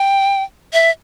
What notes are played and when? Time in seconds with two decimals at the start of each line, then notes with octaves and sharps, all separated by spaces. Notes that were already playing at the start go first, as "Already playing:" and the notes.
Already playing: G5
0.73 E5